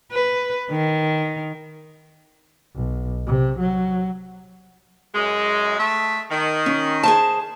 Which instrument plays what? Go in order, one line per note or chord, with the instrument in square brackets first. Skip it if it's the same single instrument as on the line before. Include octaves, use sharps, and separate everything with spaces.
[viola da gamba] B4
D#3
[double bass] B1
C3
F#3
[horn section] F#2 G#3
A3 E5
D#3
[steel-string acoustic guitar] C#4
G#4 C5 A5